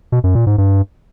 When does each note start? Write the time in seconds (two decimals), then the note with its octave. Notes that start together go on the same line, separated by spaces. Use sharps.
0.12 B2
0.24 F#2
0.35 A#2
0.47 G#2
0.58 G2